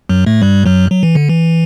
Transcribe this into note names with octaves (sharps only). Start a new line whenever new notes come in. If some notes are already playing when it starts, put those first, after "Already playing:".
F#2 F#3
A2 A3
G2 G3
F#2 F#3
F#3
E3
D3
E3